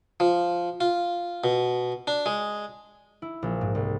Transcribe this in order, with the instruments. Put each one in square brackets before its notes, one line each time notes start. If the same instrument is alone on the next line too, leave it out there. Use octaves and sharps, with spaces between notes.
[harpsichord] F3
F4
B2
D4
G#3
[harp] E4
A#1
G#2
C2